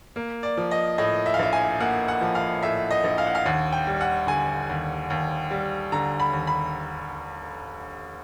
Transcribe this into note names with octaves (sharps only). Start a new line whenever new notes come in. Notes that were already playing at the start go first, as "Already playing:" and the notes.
A#3
D5
F3
D#5
A2 D#5
E5
F5
A#1 E5
G#5
A#3 F#5
F#5
F3
F5
A2 E5
D#5
A#1
F5
F#5
F5
D#2 F#5
G5
G3
F#5
D3 G#5
D#2
D#2
G3
D3 A#5
B5
D#2
B5